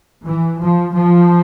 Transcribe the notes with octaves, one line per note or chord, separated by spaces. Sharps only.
E3
F3
F3